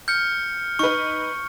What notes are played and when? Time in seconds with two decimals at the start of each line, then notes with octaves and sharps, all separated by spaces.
0.08 F6 G6 C#7
0.79 D#4 B4 C#6